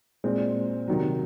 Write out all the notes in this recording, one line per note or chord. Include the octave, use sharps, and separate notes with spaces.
A#2 G#3 C4
C3 D#3 F#3